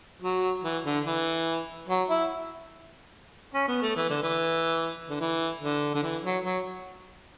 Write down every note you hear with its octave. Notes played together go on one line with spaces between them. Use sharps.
F#3
E3
D3
E3
F#3
E4
C#4
B3
A3
E3
D3
E3
D3
E3
D3
D3
E3
F#3
F#3